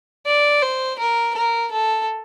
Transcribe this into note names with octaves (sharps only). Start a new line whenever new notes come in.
D5
C5
A#4
A#4
A4